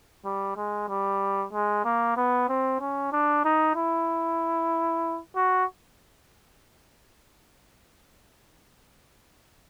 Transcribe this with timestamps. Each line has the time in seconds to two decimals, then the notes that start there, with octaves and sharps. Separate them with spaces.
0.25 G3
0.57 G#3
0.89 G3
1.53 G#3
1.85 A#3
2.17 B3
2.49 C4
2.80 C#4
3.12 D4
3.45 D#4
3.76 E4
5.36 F#4